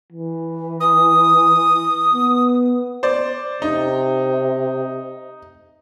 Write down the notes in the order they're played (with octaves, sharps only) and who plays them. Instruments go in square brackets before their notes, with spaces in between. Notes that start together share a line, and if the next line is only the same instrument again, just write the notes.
[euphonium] E3
[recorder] D#6
[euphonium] B3
[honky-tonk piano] C5 D5
[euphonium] C3 [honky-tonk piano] D#4